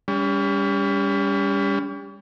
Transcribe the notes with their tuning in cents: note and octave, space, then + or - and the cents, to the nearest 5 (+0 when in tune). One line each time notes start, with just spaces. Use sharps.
G3 +25 C#4 +40